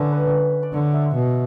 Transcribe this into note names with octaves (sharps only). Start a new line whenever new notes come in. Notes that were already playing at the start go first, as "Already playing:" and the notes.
Already playing: D3 A3 B3 C#4
B4
D5
D3 C#5
E5
B2